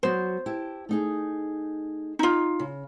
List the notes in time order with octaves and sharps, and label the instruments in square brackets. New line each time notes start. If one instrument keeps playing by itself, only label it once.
[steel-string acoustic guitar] F#3 B3 F#4 [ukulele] C5
[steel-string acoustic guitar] E4 G4 A5
A3 D#4 G#4
[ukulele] D#4 F4
[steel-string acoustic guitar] C#3